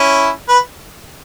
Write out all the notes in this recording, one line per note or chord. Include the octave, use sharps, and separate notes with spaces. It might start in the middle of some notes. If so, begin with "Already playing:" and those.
Already playing: C#4 E4
B4